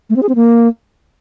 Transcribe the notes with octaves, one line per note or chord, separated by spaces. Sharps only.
A3
C4
G#4
C4
A#3